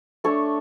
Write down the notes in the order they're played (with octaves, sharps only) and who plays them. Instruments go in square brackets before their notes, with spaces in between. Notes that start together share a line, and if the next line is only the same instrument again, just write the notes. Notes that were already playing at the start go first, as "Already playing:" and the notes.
[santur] A3 D4 A4 C#5